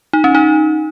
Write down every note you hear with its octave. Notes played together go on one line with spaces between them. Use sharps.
D#4
C#4
D#4